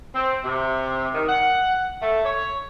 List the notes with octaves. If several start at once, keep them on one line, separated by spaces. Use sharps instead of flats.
C4
C3
D#3
F#5
A3
C#5